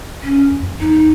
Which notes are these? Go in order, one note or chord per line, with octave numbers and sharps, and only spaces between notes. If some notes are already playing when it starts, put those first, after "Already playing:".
C#4
E2
F#2
E2
D#4